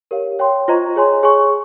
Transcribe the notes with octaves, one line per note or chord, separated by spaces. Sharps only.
G4 A#4 C#5 F5
C#5 G5 C6
F4 C5 D#5 A#5 C#6
G#4 C#5 G#5 C6
G#4 C#5 G#5 C#6